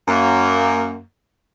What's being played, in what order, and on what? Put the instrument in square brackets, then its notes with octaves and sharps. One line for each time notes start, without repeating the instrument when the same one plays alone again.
[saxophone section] F#2 A#3